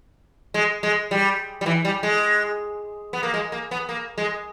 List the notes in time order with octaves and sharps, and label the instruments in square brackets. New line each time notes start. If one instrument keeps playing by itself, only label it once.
[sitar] G#3
G#3
G3
G3
E3
G3
G#3
B3
A#3
G#3
A#3
B3
A#3
G#3